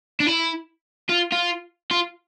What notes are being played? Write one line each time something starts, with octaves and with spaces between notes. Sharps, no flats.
D4
E4
F4
F4
F4